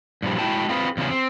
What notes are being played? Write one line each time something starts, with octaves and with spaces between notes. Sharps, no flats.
G2 A#2 E3 F3 G3
G#3 E4 F#4 G5 A5
C4 F4 G#4 B4
E2 C#3 A3 F4 G#4
C4